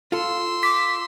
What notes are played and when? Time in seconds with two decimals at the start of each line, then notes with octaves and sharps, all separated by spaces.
0.12 F4 A4 C6 E6
0.63 D6 B6